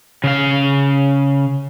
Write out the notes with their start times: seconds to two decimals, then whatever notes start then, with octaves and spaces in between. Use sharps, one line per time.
0.24 C#3 F5